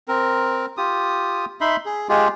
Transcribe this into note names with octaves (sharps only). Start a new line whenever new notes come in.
C4 A#4
F4 G4 D#6
D#4 E5 B5 C6
G#4
G#3 F4 G4 G#4